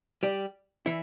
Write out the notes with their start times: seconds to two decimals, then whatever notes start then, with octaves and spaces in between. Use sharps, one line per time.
0.23 G3 G4
0.86 E3 E4